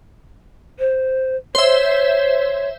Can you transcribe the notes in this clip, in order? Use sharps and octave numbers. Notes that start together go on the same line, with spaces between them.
C5
C5 C#5 E5